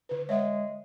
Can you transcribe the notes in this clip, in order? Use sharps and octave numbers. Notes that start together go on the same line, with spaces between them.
D3 B4
G#3 C#5 E5 F#5